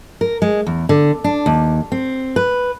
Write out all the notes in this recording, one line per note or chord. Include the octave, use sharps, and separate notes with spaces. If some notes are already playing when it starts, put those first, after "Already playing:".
A#4
G#3
E2
D3
D4
D#2
C4
B4